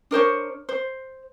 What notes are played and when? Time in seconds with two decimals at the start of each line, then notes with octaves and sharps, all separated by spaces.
0.11 D4 A#4 C5 C#5
0.69 C5